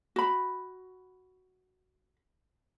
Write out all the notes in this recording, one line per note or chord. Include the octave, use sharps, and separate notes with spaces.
F#4 B5